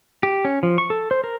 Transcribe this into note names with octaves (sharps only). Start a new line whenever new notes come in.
G4
C#4
F3
C#6
A4
C5
A#4